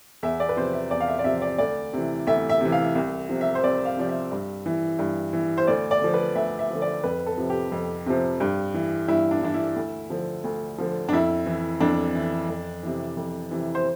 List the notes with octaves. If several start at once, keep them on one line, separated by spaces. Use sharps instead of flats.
E2 E5
D5
B4
C3 F3 C5
E5
E2 D5
F5
E5
D5
C3 F3 E5
D5
D2 D5
C3 E3
D2 E5
E5
C3 E3
F5
C2
C3 F3
E5
C5
C2 D5
F5
C3 F3 D5
E5
G2
E3
G2
E3
C5
D2 D5
D5
D3 F3
B4
D2 E5
E5
D3 F3
D5
F2 B4
A4
C3 F3
G4
F2
C3 F3
G2
E3
G2 E4
D4
E3 D4
E4
D2
D3 F3
D2
D3 F3
D4
F2 E4
E3
F2 D4
E3
F2
C3 E3
F2
C3 E3
C5